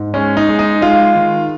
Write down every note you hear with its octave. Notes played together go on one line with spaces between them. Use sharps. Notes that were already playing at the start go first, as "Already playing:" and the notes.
Already playing: G#2
G#3 C#4
D#4
G#3
D#4
G#3 F4
D#3